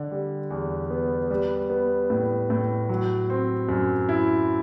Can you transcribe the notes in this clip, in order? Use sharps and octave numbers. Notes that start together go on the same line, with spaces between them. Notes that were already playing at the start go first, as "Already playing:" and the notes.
Already playing: D3
G3
E2
B3
G3
B3
A2
A2
F#3
C4
F#2
E4